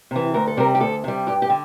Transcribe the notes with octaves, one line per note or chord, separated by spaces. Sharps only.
C3 E3
D2 A#4
A4
C3 G3 A#4
G4
D2 A4
C3 G3
G2 G4
G4
D3